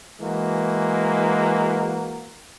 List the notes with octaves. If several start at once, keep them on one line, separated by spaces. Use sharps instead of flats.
E3 G#3 A#3 F#4